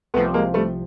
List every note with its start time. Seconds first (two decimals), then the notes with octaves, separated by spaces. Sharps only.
0.14 C2 C3 F3 A3 B3
0.34 G#3 A#3
0.54 G3 A3